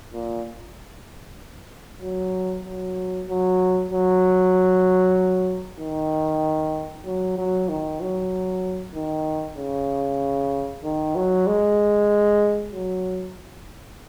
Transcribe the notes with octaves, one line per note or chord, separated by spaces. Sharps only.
A#2
F#3
F#3
F#3
F#3
D#3
F#3
F#3
D#3
F#3
D#3
C#3
D#3
F#3
G#3
F#3